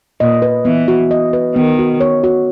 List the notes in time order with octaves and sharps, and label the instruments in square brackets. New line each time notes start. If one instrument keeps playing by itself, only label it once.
[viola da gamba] A#2 [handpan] D#5
[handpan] B4
[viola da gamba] E3 [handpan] B3
[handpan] F#4
D#5
B4
[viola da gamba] D#3 [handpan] B3
[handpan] F#4
C#5
F#4